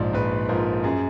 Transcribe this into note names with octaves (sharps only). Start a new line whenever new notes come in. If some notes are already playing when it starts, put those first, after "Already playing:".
Already playing: A#1 G#2 F3 D5
A#1 B4
G#2 F3 A#4
F#2 G#4